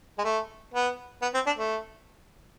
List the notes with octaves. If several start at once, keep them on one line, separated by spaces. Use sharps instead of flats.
G#3
A3
B3
B3
C4
D4
A3